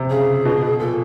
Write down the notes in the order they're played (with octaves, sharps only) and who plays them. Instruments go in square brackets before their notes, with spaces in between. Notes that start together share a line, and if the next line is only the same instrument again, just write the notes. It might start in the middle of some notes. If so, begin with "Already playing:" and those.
Already playing: [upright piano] C3
[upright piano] C#3 [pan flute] G#4
[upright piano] B2
B2
[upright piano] A#2 [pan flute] A4